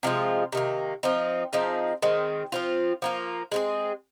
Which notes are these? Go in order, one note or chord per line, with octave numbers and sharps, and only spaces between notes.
C3 F3 G#3 F4
C3 D#3 A#3
F3 C4 D#4
F3 C4 D#4 G#4
D#3 G#3 C4
F3 C4 F4
F3 A#3 F4
G#3 C4 G#4